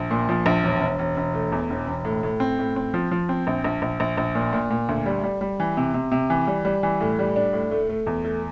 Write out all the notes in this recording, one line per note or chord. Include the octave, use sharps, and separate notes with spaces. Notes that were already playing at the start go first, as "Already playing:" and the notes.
Already playing: A#1
A#2
F3
A#1
E1
E1
E1
E1
A3
E2
E1
E1
A2
A2
C4
A2
C4
F3
F3
C4
A#1
A#1
A#1
A#1
A#1
A#2
A#2
A#2
D2
G3
G3
G3
E3
C3
C3
C3
E3
G3
G3
E3
A2
G3
D4
A2
A3
A3
E2
A3